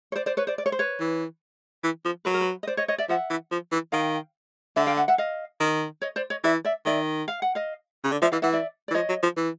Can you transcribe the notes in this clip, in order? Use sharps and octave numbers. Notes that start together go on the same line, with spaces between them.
C#5
C5 D5
C5 D5
B4 C#5
C5 D5
D5
C#5
C5
B4 C#5
E3
E3
F3
F#3 B4
A#4
B4
D#5
C5 D5
C#5 D#5
C#5 D#5
D5 E5
F3 E5 F#5
E3
F3
E3
D#3 F5 G5
D3 E5 F#5
F5 G5
E5 F#5
E5 F#5
D#5 F5
D#3
C#5 D#5
C5 D5
C#5 D#5
E3 D5 E5
D5 E5
D#3 D5 E5
F5
F#5
D#5 F5
C#3
D3
F3 D5 E5
E3 D#5 F5
E3 E5 F#5
D5 E5
E3 D5
F3 C#5 D#5
F#3
F3
E3